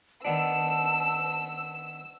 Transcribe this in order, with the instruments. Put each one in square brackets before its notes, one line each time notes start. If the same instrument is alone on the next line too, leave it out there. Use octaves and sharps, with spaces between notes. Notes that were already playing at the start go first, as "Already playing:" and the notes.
[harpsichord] D#3 B3 D4 [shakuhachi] A5 [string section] E6